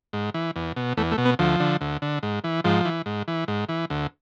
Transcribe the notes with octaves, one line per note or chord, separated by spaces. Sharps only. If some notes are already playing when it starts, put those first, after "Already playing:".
G#2
E3
E2
B2
E2 A3
A3
B2
B3
D2 F3
D3
D2
D3
G#2
E3
G#2 F3
E3
G#2
E3
G#2
E3
D2